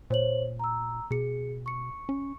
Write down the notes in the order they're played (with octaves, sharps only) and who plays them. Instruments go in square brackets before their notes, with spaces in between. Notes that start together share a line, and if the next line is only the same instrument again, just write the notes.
[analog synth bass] A#2 [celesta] C5 C#5 F#7
[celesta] A#5 E6
[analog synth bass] B2 [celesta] G#4 C#7
[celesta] C#6 C#7
[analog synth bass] C#4